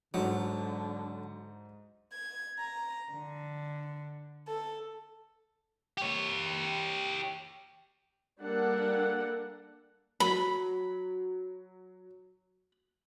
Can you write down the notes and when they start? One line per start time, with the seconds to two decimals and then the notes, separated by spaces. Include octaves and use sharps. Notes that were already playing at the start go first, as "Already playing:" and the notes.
0.14 G#2 D3 F#3 D#4
2.12 G#6
2.58 A#5
3.10 D3
4.47 A4
5.97 G4 C#5
8.41 G3 A#3 D4 A4 F#5
10.20 F#3 B5